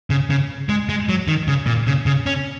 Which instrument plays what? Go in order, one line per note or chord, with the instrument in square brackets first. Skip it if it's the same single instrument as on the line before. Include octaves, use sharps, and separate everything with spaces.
[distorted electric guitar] C#3
C#3
G#3
G#3
F#3
D#3
C#3
A#2
C#3
C#3
C#4